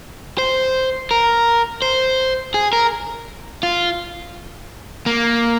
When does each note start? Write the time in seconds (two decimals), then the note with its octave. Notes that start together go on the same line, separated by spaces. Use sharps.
0.38 C5
1.11 A#4
1.82 C5
2.54 G#4
2.73 A#4
3.63 F4
5.06 A#3